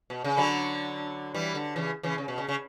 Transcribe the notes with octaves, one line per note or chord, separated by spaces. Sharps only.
B2
C#3
D3 F#3
E3 G3
D3
C#3 E3
C#3 E3
C#3
B2
C#3
C#3